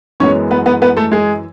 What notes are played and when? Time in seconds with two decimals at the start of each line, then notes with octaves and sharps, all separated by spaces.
0.20 F#2 E3 G#3 B3 C#4 C#5
0.51 B3 B4
0.66 B3 B4
0.82 B3 B4
0.97 A3 A4
1.12 G#3 G#4